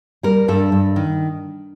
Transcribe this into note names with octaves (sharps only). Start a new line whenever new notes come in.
G3 A#4
G2 A4
G2
D#3